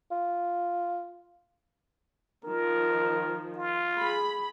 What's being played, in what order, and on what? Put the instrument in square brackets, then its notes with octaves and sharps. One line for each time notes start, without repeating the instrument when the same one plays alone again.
[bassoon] F4
[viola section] D#3 F3 [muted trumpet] A#4
[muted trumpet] F4
[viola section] G#4 B5